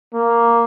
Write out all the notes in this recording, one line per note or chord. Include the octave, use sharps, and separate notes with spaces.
A#3